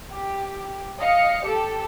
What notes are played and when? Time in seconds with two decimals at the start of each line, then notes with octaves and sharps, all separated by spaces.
0.12 G4
0.99 D#5 F5 C#7
1.43 G4 A4